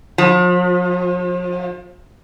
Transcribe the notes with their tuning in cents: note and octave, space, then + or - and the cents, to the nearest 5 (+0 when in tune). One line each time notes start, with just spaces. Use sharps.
F3 +40